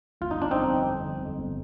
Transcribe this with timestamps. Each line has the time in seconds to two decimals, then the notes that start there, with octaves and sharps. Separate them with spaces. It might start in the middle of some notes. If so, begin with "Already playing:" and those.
0.21 G1 F4
0.31 D#4
0.38 G1 D4
0.51 F2 C4 D#4
0.71 D3
0.88 F2
1.04 D3
1.22 F2
1.38 G1